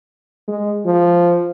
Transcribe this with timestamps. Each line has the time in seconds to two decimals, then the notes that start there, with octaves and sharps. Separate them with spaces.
0.48 G#3
0.86 F3